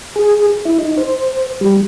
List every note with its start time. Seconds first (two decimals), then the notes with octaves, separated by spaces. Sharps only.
0.16 G#4
0.65 E4
0.78 D#4
0.97 C5
1.61 G3